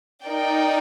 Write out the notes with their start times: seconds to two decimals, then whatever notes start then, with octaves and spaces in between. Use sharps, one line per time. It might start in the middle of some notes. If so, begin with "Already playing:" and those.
0.25 D#4 A#4 D5 G5